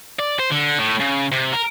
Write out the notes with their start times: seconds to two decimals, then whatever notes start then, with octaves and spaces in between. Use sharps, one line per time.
0.19 D5
0.39 C5
0.50 D3
0.79 A2
1.00 C#3
1.32 C3
1.54 A#4